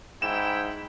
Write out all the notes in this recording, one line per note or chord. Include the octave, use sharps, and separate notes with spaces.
G#2 E4 G5 E7